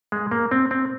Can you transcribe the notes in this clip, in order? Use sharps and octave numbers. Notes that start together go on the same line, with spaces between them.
G#3
A#3
C4
C4